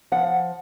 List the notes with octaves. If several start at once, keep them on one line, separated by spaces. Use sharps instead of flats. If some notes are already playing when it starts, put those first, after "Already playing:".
F3 F#5